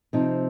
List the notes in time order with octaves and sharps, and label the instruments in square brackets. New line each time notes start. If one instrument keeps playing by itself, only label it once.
[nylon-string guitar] C3 F3 C4 D#4